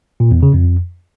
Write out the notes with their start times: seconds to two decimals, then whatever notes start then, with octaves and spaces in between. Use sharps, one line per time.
0.20 A#2
0.31 E2
0.43 C#3
0.54 F2